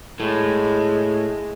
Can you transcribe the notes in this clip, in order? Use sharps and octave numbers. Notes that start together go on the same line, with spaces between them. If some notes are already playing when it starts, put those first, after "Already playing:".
A2 G#3